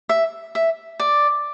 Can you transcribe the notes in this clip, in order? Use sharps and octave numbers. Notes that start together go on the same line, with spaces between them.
E5
E5
D5